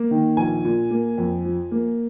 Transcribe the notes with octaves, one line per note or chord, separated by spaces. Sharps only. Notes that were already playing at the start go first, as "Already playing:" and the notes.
Already playing: A#3
D#3
A#1 G#5
A#2
A#3
F2
F3
A#3